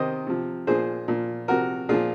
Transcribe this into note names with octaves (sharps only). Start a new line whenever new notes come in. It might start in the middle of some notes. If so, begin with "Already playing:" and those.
Already playing: C3 D#3 C5 D#5
C3 F3
A#2 F3 G#4 C5
A#2 F3
C3 F3 F#4 A#4
A#2 F3 F4 G#4